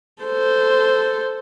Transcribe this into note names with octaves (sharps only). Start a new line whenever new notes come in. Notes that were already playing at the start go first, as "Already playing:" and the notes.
A4 C5